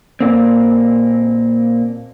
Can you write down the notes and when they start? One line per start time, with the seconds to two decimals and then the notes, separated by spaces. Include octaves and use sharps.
0.21 A#2 A#3 C4